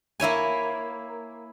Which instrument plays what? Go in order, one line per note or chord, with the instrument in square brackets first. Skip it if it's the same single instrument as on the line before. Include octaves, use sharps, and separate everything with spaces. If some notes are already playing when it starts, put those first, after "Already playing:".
[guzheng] A#3 E4 C#5 G#5